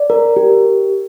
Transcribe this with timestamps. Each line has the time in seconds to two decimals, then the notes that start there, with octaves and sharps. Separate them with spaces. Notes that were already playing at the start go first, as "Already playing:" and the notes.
Already playing: D5
0.10 A#4
0.37 G4